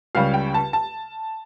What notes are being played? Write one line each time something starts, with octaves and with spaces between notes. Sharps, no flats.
C#2 C#3 G3 F5
G5
A5
A5